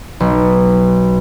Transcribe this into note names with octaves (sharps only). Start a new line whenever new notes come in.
B1